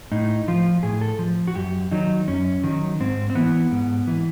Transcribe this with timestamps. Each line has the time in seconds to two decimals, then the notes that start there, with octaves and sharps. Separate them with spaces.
0.12 A2 D#4
0.48 F3 F4
0.83 A2 G#4
1.01 A4
1.19 F3
1.48 F#4
1.55 F#2 G4
1.91 D#3 F#3 D#4
2.28 F#2 C#4
2.64 D#3 F#3
3.00 G#2 C4
3.30 C4
3.35 E3 B3
3.72 G#2
4.07 E3